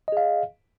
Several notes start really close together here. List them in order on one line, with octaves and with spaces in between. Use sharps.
D#5 G#4 F5